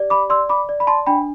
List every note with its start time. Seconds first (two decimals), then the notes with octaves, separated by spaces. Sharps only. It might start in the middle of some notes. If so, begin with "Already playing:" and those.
Already playing: G4 D5
0.10 B5 D6
0.30 D5 C6 E6
0.49 B5 D6
0.69 D5
0.80 B5
0.87 A5 C6
1.07 D4 G5 B5